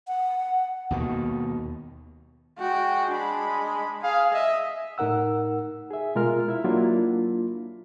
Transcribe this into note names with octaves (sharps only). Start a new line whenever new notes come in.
F#5
D#2 B2 D#3
G#3 F#4 G5
D4 B5
G#4 F5
D#5 E5
A2 D#4 A#4 F#5 E6
G#4 E5
B2 G#3 F4 A#4 F6
E4 E5
F#3 A#3 D4 E4 F4